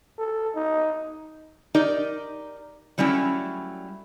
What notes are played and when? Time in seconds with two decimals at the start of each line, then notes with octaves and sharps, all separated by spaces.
0.19 A4
0.55 D#4
1.75 D#4 G4 A#4 D5
2.98 F#3 G3 A3 C#4 E4